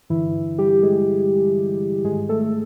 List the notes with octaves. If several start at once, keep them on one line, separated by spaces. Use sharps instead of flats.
G2 D3 E3 E4
G3 G4
G#3 G#4
G#2 D#3 G#3 G#4
A3 A4